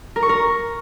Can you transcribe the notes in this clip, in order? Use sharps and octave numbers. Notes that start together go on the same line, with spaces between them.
A#4
C#6
A#4